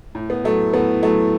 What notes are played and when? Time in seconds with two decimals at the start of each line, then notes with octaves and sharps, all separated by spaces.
0.15 A2
0.30 B3
0.44 F#3 A3
0.74 A2 B3
1.03 F#3 A3